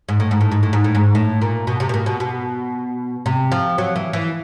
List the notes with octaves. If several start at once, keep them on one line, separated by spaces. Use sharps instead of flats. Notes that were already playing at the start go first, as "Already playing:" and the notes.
G#2
A2
G#2
A2
G#2
A2
G#2
A2
G#2
A2
A#2
B2
C3
B2
A#2
B2
B2
C3
F3
F#3
E3
E3